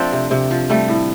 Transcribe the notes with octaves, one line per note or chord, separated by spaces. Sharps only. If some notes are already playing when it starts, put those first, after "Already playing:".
Already playing: F3 A3 C4 D4
C3
C3
F3
G3 A3
A2